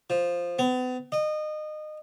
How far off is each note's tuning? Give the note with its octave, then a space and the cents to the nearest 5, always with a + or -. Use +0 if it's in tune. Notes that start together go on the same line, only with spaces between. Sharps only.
F3 +0
B3 +40
D#5 -25